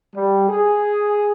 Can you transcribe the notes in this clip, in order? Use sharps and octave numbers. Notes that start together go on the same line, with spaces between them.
G3
G#4